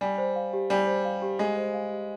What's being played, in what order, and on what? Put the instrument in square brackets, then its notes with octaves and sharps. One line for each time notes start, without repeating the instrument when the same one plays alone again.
[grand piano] G3 [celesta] G#5
[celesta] C5
F5
G4
[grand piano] G3 [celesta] G#5
[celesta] C5
F5
G4
[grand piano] G#3 [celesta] G#5
[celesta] C5
F5
G4